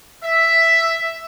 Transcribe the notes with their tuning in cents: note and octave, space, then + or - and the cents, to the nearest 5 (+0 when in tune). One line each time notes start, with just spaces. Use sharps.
E5 +5